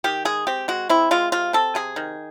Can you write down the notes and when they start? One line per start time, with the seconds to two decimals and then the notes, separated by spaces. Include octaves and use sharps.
0.04 D#3 G4
0.25 G#3 G#4
0.47 C4 G4
0.68 G#3 F#4
0.89 C4 E4
1.11 G#3 F4
1.32 C3 F4
1.53 C4 A4
1.75 C3 G#4
1.96 D#3